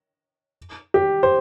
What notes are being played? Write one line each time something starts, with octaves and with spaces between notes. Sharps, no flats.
G4
C5